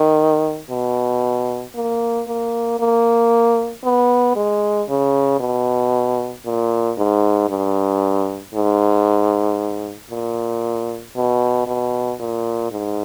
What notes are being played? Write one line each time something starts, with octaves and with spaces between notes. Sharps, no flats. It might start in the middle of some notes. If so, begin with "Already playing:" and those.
Already playing: D#3
B2
A#3
A#3
A#3
B3
G#3
C#3
B2
A#2
G#2
G2
G#2
A#2
B2
B2
A#2
G#2